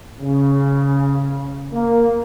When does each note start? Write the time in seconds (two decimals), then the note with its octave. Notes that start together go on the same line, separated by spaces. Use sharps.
0.20 C#3
1.73 A#3